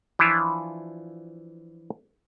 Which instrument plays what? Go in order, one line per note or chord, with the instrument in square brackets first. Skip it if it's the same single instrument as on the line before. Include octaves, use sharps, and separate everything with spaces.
[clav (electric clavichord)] E3 F3 D4 E4 F4